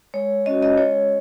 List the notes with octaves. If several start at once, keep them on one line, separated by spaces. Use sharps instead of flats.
G#3 C#5
C#4 F#4 D#5
D#5
G#3 C#5